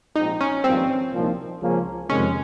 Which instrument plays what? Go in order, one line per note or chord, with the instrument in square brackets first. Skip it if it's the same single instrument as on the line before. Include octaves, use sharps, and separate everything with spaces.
[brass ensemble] A#1 G#2 F3 C4 [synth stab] D#4
[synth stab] C#4
[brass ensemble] G#1 G2 F3 A#3 [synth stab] C4
[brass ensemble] C2 A#2 F3 A#3 D#4
C#2 C#3 F3 A#3 C#4
[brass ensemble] F2 C3 D#3 G#3 [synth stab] C#4